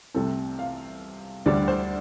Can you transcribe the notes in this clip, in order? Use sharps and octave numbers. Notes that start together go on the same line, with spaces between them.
C2 C3 A3 C4 A4
F5
D2 D3 G3 D4 D5
C5